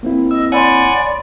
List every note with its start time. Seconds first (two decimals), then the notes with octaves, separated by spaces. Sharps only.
0.03 A#3 C4 E4
0.31 D#5 E6
0.52 C#5 D5 F#5 G#5 B5 C6